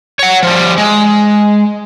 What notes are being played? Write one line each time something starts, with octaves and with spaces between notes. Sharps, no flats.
C#5 F#5
F3 G3
G#3